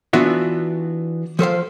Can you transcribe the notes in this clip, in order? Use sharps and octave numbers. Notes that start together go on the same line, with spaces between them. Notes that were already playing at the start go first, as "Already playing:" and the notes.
E3 B3 D4 F4 F#4 E5
F3 A4 C5 F5